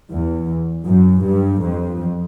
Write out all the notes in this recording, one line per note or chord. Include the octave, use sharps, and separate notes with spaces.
E2
F#2
G2
F2